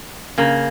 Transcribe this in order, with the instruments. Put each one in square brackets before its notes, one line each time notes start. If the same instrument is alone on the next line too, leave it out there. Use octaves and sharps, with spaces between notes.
[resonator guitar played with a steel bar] C#3 A#3